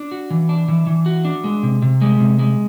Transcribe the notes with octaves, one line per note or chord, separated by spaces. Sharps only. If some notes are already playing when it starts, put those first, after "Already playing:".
Already playing: D4
F#4
E3
D4
E3
E3
F#4
D4
G#3
C3
C3
G#3
C3
G#3